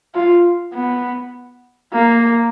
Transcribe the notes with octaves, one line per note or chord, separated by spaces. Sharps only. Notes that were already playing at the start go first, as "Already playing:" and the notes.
F4
B3
A#3